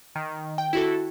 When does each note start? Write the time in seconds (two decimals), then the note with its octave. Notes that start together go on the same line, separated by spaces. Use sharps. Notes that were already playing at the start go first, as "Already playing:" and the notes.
0.15 D#3
0.58 G5
0.73 E4 F#4 A4